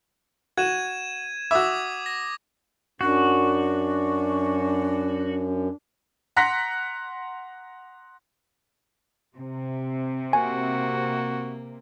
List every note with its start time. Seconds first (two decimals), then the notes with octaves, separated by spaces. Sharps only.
0.57 F#4 G#6 D#7 E7
1.51 F#4 E5 D6 D#6 G#6
2.06 A#6
3.01 F#2 D4 F#4
6.36 F#5 A#5 C6 F#6 A#6 B6
9.36 C3
10.33 A#3 F#4 G#5